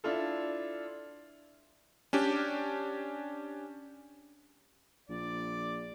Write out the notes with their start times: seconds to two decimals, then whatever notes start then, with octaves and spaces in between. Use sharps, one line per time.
0.04 D4 E4 F4 A4
2.13 C#4 D4 G4
5.09 A#1 D5